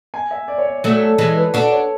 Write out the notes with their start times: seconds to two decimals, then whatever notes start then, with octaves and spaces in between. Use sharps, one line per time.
0.14 G#5
0.31 E5
0.48 D5
0.58 C#5
0.66 D5
0.83 F#3 A3 D5
1.02 A4
1.18 E3 G#3
1.37 B4
1.54 D4 F#4 A4
1.72 C#5